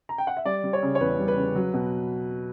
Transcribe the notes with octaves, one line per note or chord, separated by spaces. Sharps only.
A#5
G5
F#5
E5
G3 D5
G3
C#5
C#3
C#5
E2 B4
G3
B4
C#3
F#3
B2